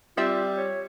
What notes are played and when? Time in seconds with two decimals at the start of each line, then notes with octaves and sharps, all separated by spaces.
0.17 G3 C4 F4 D5 E5
0.57 C#5